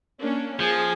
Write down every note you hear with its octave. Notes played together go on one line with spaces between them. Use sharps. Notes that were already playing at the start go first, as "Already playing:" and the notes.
A#3 C#4 D4
F3 G#4 G#5